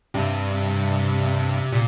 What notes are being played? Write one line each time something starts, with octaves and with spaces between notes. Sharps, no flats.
G2 C3
A#2